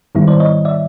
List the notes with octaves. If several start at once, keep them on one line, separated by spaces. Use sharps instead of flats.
G#2 D#3 G3 B3 E4
C5 D5
C#5 D#5
D5 E5